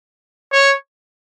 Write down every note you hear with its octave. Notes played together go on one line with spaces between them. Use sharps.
C#5